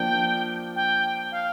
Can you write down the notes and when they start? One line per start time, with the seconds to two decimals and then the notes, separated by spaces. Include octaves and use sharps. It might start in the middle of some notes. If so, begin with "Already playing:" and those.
Already playing: F3 A#3 D4 G5
0.76 G5
1.32 F5